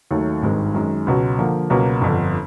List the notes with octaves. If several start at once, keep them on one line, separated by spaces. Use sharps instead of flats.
D#2 D#3 F#3 A3
G#1 G2 D#3 G#3 C4
F#2 D#3 G#3
C#2 B2 F#3
D3 F3 A#3
C#2 B2 F#3 A#3
G1 F2 D3